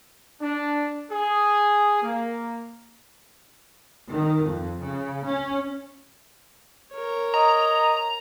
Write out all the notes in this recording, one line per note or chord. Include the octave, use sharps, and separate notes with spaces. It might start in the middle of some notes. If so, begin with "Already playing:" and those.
D4
G#4
A#3
D#3
F2
C#3
C#4
A#4 C#5
D#5 A#5